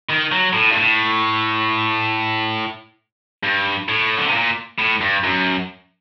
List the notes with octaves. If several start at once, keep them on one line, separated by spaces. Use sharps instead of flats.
D#3
F#3
A2
G2
A2
G2
A2
D3
C3
A#2
A2
G2
F#2